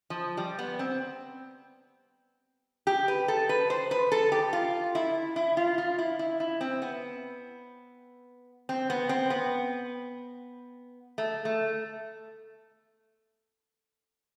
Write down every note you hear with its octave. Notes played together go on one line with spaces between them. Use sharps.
F3
G3
B3
C4
G4
B4
A4
B4
C5
B4
A4
G4
F4
E4
E4
F4
F4
E4
E4
E4
C4
B3
C4
B3
C4
B3
A3
A3